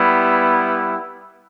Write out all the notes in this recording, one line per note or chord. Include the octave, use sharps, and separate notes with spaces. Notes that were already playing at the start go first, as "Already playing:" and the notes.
Already playing: G3 B3 E4